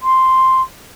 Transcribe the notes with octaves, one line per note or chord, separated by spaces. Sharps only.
C6